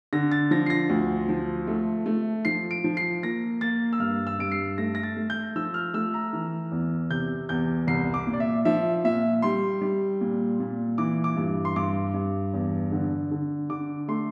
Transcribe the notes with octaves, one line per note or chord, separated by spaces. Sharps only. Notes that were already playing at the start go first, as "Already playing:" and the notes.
D3 A#6
A6
F3 A#6
C7
A#6
D2
F3
A3
A3
F3 C7
D7
F3
C7
A#3 A#6
A#3 A6
E6
G2 F6
E6
G2 D7
C7
A3 A#6
A#6
A6
A3
G6
F3 E6
F6
A3 E6
A#5
E3
E2
C3 G6
E2 G6
C2 C7
D6
A#2
D5
E5
F3 E5
A#2 E5
G3 C6
G3
A#2
A#2
E3 D6
D6
G2
C6
G2 D6
G2
E2
D3
D3
D3 D6
A3 C6